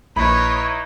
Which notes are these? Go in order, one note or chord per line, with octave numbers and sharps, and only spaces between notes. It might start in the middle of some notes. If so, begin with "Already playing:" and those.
A#1 D#4 E4 B4 C#5 B5